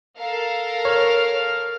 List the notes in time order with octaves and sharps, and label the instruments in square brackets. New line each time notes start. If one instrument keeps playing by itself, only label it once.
[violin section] A4 A#4 F5
[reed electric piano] C#5 [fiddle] F6